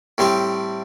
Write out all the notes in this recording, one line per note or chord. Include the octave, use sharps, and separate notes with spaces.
A2 G3 C4 G4